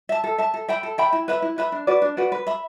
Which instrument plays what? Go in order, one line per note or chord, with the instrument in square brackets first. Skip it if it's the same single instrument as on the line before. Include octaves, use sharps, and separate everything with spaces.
[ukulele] E5 A5
A4
E5 A5
A4
E5 G5 B5
A4
E5 G5 B5
E4
B4 E5 B5
E4
B4 E5 B5
D4
F#4 B4 D5
D4
F#4 B4 D5
B4
E5 B5